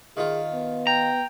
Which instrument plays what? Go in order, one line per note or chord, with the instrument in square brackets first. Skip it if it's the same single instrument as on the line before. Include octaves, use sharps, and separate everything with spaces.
[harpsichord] D#3 F4 [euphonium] G#4
[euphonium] B3
[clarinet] G5 [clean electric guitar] A#5